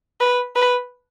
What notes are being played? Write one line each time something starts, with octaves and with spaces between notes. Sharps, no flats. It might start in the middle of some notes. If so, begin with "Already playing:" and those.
B4
B4